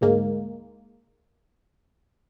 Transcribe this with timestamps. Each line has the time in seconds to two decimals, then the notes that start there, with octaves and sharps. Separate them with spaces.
0.01 D2 G#2 G#3 A#3